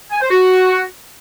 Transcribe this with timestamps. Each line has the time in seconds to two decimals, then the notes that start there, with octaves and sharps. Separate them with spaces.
0.11 G#5
0.21 C5
0.31 F#4